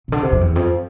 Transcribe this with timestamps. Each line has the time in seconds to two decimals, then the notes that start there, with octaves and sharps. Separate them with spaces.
0.08 C3
0.12 D3
0.23 C3
0.32 F2
0.41 E2
0.56 F2